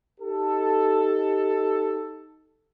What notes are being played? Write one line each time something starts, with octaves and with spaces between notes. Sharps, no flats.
D#4 G4 A4